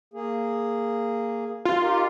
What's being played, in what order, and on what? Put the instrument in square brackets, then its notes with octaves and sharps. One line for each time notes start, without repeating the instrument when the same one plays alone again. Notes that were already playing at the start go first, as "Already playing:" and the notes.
[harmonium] A#3 G#4
[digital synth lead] F4
[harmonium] D#4 G4 A#4